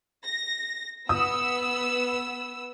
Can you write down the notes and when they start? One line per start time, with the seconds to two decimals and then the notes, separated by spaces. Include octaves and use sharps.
0.25 A#6
1.09 B3 D#6 E6